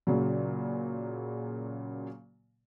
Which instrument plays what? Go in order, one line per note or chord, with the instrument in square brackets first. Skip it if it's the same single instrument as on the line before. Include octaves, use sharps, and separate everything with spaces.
[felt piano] A#2 C#3 F#3